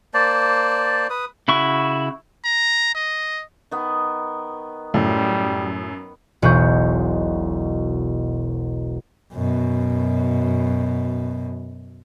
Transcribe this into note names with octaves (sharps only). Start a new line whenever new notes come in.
A#3 C5 D5 A5
B4 D#6
C#3 E4 F#4 C#6
A#5
D#5
D#3 B3
F#2 A2 G3
E1 B1 F#4 B4 C#6 G6
F#2 B2